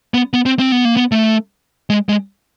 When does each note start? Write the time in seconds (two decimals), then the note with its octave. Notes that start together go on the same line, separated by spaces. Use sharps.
0.14 B3
0.33 B3
0.46 C4
0.59 C4
0.72 B3
0.85 A#3
0.97 B3
1.12 A3
1.90 G#3
2.09 G#3